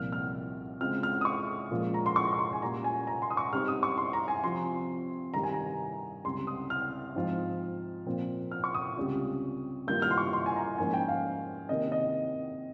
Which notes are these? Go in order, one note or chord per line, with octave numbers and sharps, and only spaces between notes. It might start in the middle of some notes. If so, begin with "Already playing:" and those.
Already playing: C2 A#2 F3 F6
F6
C#3 G#3 C4 F4 F6
F6
D#6
C#6
A#2 F3 G#3 C#4 F4
A#5
C6
C#6
C#6
C6
G#5
A#2 G3 C#4 F4 A#5
G#5
A#5
C6
D#6
C#6
G2 G3 C4 D#4 F6
D#6
C#6
C6
A#5
G#5
C3 F3 C4 F4 C6
G2 D#3 G3 A#5
G#5
A#5
C#2 C3 G3 C6
D#6
F6
G#2 F3 C4 F4
A#2 F3 C4 F4
F6
C#6
D#6
C#2 C3 G3 C#4 F4
G2 D#3 A#3 F4 G6
F6
C6
C#6
C6
G#5
A#5
G#2 F3 A#3 C#4 G#5
G5
F5
C3 D#3 A#3 D#5
D#5